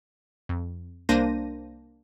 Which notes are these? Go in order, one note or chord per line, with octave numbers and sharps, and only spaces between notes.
F2
C2 A#3 D4 C5 A#6 D#7